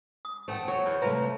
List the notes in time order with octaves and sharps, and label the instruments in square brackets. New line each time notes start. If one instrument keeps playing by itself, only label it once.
[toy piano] D#6
[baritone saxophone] A3 [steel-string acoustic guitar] C5 F#5 G5
[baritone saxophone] F#3 [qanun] C#5
[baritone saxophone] E2
[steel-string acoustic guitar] C3 A3 [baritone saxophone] F3 [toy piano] B4 E5 A#5